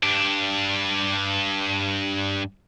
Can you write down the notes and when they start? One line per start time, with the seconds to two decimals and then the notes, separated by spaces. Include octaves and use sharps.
0.03 G2 D4